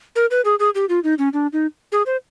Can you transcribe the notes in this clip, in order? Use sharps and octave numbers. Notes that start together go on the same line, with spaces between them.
A#4
B4
G#4
G#4
G4
F4
D#4
C#4
D4
D#4
G#4
C5